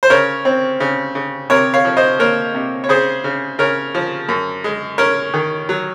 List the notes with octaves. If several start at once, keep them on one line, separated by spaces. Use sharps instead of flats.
C5
C#3 A#4 C#5
C4
C#3
C#3
C3 A#4 C#5
C#5 F5
F3
C5 D#5
A#3 A#4 C#5
C3
C#5
C#3 G#4 C5
C#3
C#3 A#4 C#5
F3
F#2
G#3
C#4 A#4 C#5
D#3
F#3